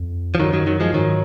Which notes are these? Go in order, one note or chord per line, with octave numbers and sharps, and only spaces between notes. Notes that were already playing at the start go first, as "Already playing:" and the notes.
Already playing: F2
F3
F#2 D#3 F#3
D#3 F#3
D#3 F#3
F3 G#3
G#2 D#3 F#3